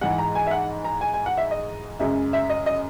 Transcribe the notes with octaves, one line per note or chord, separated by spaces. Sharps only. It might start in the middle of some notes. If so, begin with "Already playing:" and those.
G#2 E3 G#3 F#5
A#5
G#5
E5
F#5
A#5
G#5
G#5
F#5
E5
D#5
F#2 C#3 G#3 E5
E5
D#5
D#5